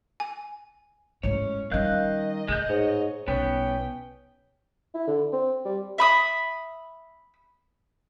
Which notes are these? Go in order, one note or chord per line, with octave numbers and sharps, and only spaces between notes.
G#5
A2 G#3 C#4 C#5
D#3 G3 C#4 D#5 F5 F#6 G6
A2 G#3 G6
G#2 C#5
B1 G3 B3 C#4 B4 G5
E4
D3
C4
G3
E5 B5 D#6